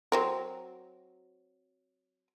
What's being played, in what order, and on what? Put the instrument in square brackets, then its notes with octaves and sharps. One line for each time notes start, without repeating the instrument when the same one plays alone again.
[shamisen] F#3 C4 A#4